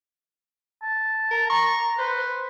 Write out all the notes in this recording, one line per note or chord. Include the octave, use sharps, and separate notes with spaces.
A5
A#4
A#5 C#6
B4 C5